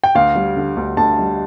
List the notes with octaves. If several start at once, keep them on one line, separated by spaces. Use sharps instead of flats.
G5
D2 F5
G3
D3
D2
D2 A5
G3